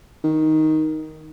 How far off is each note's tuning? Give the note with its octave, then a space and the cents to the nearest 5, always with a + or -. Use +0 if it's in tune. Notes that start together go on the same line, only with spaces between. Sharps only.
D#3 +5